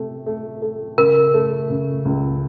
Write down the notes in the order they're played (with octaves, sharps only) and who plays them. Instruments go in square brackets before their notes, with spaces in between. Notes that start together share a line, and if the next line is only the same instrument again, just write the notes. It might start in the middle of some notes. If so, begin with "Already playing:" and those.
Already playing: [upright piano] C3 A3
A3
A3
[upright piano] C#3 [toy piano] A#4
[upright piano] A3
C#3
C#2